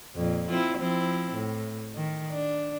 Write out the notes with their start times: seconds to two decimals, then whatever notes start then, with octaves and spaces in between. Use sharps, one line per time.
0.15 F2 A#2
0.48 C4 E4 F4
0.78 F3 C4 E4
1.34 A2
1.95 D#3
2.31 D4